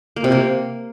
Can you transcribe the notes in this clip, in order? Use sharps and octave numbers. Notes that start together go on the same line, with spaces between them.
A#3
C3
A#3